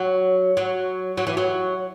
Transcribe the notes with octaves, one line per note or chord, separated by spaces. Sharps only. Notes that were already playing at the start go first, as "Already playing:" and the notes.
Already playing: F#3
F#3
F#3
E3
F#3